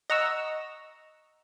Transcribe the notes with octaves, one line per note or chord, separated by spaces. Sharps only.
D#5 F#5 A#5 C#6 E6